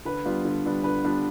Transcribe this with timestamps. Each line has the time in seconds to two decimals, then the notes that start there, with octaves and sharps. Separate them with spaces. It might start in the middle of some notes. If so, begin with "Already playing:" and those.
0.05 D3 B4
0.25 G3 B3 D4 F4
0.45 D3
0.64 G3 B3 D4 F4
0.84 D3 B4
1.04 G3 B3 D4 F4